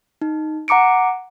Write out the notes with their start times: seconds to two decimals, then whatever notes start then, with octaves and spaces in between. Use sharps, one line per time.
0.21 D#4
0.68 F#5 A#5 D6 C#7 D7